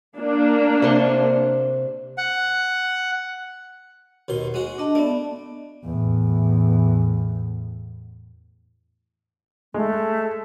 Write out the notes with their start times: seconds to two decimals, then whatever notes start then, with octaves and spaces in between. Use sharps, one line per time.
0.17 A#3 D4
0.82 C3 C6 C#6
2.18 F#5
4.28 D#2 B2 C6
4.54 G#3 F#4
4.78 D4 D#5 A5
4.95 A3 B3 D5
5.84 E2 A2
9.74 G#3 A3